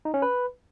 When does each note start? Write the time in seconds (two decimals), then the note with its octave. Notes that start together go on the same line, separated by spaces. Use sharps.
0.05 D#4
0.14 C#4
0.22 B4